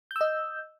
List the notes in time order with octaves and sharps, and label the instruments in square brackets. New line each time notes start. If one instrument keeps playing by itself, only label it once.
[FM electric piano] G6
E6
D#5